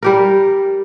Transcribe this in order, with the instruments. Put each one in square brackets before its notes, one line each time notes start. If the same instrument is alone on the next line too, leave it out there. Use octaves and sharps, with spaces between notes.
[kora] G3 G4 A#4